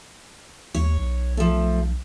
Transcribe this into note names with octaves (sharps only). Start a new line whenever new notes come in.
D#2 C#5
B1
F3 A3